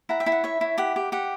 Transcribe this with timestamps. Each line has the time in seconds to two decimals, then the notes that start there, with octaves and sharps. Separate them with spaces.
0.09 E4 F#5 A#5
0.20 E5 G5
0.26 E4
0.32 F#5
0.44 C#5 E5
0.61 E4
0.78 G4 F#5
0.96 G4
1.12 G4 F#5